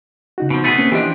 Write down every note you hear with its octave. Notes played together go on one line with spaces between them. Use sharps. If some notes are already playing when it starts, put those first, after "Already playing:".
C#3 D#4 F#4
B2 F3
A3 B3 G#4 A6
A#3 C4 C#4
E3 F3 D4 G4 D#5